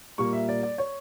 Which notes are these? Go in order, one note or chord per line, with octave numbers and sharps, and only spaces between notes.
A#2 G3 A#3 C#6
E5
D5
D5
C#5